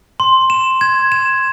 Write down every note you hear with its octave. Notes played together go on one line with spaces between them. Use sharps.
C6
E7
G#6
E7